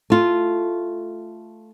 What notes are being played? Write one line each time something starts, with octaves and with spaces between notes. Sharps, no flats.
A3 F4